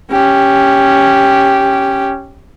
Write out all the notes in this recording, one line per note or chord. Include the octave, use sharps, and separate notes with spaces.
C#4 G4